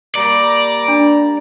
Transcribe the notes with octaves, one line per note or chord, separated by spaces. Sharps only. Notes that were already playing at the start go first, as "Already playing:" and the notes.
G3 A#3 D5 A#5
D4